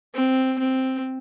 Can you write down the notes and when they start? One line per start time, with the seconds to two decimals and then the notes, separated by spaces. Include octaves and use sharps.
0.14 C4
0.59 C4